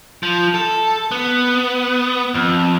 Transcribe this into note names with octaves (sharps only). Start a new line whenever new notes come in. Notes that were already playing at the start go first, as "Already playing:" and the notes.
F3
A4
B3
F2